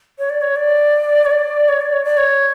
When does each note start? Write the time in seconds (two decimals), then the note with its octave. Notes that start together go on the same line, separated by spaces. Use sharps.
0.18 C#5
0.30 D5
0.41 C#5
0.56 D5
1.25 C#5
1.31 D5
1.68 C#5
1.80 D5
1.93 C#5
2.05 D5
2.17 C#5